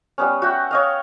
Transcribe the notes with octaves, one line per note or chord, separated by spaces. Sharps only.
G3 B3 C#4
F#4 E5 F#5 G5
C#5 D#5 F5